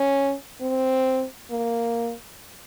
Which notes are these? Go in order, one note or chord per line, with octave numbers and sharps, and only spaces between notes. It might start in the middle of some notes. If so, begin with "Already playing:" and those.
Already playing: C#4
C4
A#3